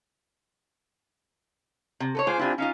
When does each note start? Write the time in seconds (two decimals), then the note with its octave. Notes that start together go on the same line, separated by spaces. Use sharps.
2.00 C3
2.15 A4 B4 C#5
2.27 G#3 F4 C5 G#5 D6
2.39 C4 D4 E4 F4 G4 G#5
2.58 C#4 D#4 F4 F5